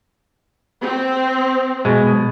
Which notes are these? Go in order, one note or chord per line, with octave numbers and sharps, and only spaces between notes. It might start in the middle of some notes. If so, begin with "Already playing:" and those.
C4
B2 G#3